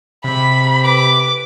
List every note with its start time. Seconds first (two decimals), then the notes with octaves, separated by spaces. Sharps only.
0.24 C3 B5
0.84 B4 D6